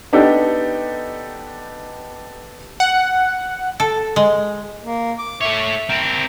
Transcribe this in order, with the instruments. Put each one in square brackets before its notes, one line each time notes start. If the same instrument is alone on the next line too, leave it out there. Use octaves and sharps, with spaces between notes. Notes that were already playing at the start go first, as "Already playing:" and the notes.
[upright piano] B3 D4 D#4 G4 A4
[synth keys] F#5
[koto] A4
G#3
[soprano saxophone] A#3
D6
[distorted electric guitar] A3 C#5 [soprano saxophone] E5
[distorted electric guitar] C4 A#4